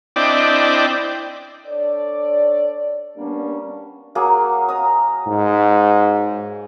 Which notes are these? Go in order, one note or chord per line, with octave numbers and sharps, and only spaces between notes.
C4 D4 E4 D5 D#5 G5
D4 A4 C#5 D5
G3 A#3 B3 C#4 D4
F#3 A#3 G#4
A#5 D#6
G#2